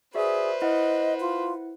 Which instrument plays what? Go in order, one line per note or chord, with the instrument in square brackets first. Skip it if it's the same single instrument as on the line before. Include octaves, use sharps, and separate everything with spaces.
[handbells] F#4 D5 E5 [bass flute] G#4 [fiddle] B4 C5
[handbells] E4 F#5 [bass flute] D#5
[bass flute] F4